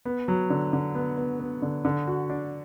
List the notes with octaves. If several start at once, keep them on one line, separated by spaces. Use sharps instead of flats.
B3
F#3
D3
D3
B3
B3
B3
D3
D3
F#4
D4